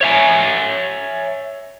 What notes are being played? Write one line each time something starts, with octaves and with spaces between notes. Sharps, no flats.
C#5 E5 G#5